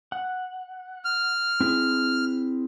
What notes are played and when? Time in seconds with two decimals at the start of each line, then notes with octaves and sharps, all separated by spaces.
0.12 F#5
1.05 F6
1.61 C4 E4 G#4